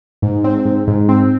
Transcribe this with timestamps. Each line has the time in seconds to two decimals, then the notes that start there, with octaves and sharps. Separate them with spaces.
0.22 G#2
0.44 C4
0.65 G#2
0.87 G#2
1.09 C4